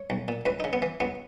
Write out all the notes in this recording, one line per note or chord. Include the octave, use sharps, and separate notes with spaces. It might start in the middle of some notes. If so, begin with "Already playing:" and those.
Already playing: C#5
B1
A#2
C#2 B4
C#3 D#4
B3
E3
C#2 B3